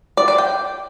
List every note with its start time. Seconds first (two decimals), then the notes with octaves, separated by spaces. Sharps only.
0.17 D5
0.28 D5
0.38 G5